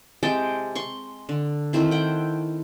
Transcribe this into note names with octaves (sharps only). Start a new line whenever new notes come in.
C3 G#3 G5 A5
C6 C#6
D3
D#3 A3 C4 E4
F#5 G5